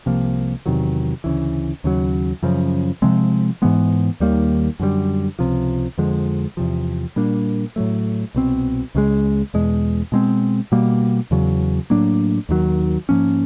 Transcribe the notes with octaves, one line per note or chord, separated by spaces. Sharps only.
C2 C3 F3 A#3
E2 C3 D#3 F#3
D2 C#3 E3
D#2 C#3 F#3
F#2 C#3 F3
C3 F3 G#3 C4
G#2 E3 G#3 B3
D#2 D#3 G3 A#3
F#2 D3 G3
C#2 C3 F3
F2 D3 F3 G#3
E2 C3 F3
A#2 G3 A#3 D4
A2 F#3 A3
C2 B2 G#3 C4
C#2 C#3 F3 G#3
E2 B2 G#3
B2 G#3 C4
B2 G3 A#3
E2 C#3 F#3
A2 F#3 A#3 D4
D#2 D#3 F#3
G#2 F3 A#3 C#4